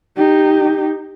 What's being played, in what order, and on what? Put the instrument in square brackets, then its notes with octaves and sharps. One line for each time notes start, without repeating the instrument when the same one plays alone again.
[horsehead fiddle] D#4 G4